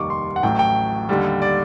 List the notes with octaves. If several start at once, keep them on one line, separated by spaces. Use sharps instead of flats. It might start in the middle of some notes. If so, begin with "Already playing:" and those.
Already playing: F1 D#2 D#3 G3 C#6 D6
C6
F#5
A1 A2 F#3 G5
G5
D#2 D3 G3
D5